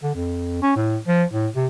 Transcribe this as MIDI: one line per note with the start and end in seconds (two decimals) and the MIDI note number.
0.03 0.13 50
0.15 0.59 41
0.63 0.72 61
0.77 0.97 45
1.08 1.24 53
1.33 1.48 45
1.56 1.67 48